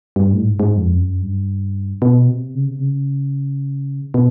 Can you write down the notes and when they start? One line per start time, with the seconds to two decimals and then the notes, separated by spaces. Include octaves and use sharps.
0.16 G2
0.33 A2
0.43 G#2
0.60 G#2
0.77 F2
0.95 F#2
1.22 G2
2.02 B2
2.28 C3
2.55 C#3
2.67 C3
2.79 C#3
4.14 B2